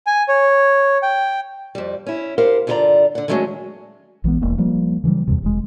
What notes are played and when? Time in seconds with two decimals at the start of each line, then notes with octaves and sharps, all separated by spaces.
0.07 G#5
0.28 C#5
1.03 G5
1.75 F2 G3
2.06 C#4 E4
2.38 G4 A#4 C5 F5 F#5
2.67 G2 D3 E4 F4 D5 A#5
3.15 D3 F#5
3.28 D3 D#3 F#3 G#3 A3 C#4
4.24 A#1 E3 G#3 B3
4.42 E1 A#3
4.58 F3 G3 A#3
5.04 C#3 E3 F#3 G3
5.27 E2 G2 C3
5.43 E1 G#3